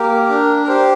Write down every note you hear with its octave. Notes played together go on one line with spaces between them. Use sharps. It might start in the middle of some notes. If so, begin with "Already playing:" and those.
Already playing: A#3 G4 A#4
D4
A#4
G4 C5